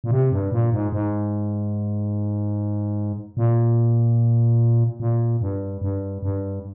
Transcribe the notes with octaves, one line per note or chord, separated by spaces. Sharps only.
A#2
C3
G2
A#2
G#2
G#2
A#2
A#2
G2
G2
G2